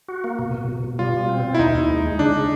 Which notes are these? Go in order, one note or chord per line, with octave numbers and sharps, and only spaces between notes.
F#4
A#3
B2
B2
B2
B2
G3 F4
B2
C4
B2
E4
D#2 D#4
D#2
G#3
G#3
C#3 D4
C#3